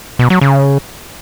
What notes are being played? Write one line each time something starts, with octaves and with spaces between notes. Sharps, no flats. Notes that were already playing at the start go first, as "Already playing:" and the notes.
B2
F#3
C#3